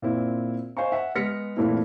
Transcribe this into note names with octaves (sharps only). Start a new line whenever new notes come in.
A#2 C4 E4
C5 D#5 F5 G#5 A#5 C#6
E5 F#5
G#3 B3 F6 A#6 B6 C#7
A#2 E3 A3 C4 E4